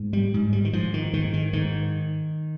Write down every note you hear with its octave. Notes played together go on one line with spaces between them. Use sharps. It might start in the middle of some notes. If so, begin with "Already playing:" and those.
Already playing: G#2
G3
G#2
G3
D#3
G#2 F3
D#3
G#2 D#3
D#3
G#2 D#3